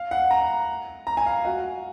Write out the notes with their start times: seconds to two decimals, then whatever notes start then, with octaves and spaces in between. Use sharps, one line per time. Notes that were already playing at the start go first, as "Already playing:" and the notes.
Already playing: F5
0.11 F#5
0.31 A#5
1.07 A#5
1.17 G#5
1.26 F5
1.45 F#4